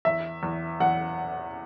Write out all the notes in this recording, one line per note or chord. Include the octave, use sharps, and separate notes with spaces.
E2 E5
E2
E2 F#5